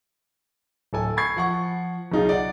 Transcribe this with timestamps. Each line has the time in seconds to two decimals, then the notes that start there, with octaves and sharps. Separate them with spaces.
0.93 D1 A4 G#5
1.17 B5 C#6 G#6 C7
1.36 F3 F#5 C#6
2.11 B1 C#3 D#4 F4 G#4
2.29 D5 F#5